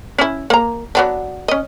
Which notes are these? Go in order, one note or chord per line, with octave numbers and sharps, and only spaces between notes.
C#4 E4
A#3 A#5
F#3 B3 D4
C#4 D#5